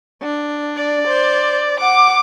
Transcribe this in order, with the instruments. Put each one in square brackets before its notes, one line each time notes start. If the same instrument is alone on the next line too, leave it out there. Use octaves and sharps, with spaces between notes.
[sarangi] D4
[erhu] D5
[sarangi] C5
[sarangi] F#5 [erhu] D6